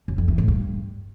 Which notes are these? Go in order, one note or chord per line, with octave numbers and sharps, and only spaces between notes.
F#2
F2
E3
A2
G2